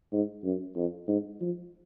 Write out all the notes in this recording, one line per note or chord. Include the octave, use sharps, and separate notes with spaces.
G#2
F#2
F2
G#2
F3